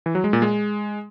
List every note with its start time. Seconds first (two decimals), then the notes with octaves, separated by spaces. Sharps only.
0.06 E3
0.15 F#3
0.24 G#3
0.33 A#2
0.42 G#3